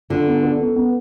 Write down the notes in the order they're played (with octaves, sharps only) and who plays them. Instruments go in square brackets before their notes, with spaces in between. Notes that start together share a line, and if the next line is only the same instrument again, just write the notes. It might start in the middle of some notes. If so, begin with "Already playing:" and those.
[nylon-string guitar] D3 [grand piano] F4
[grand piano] B3
A4
B3
B3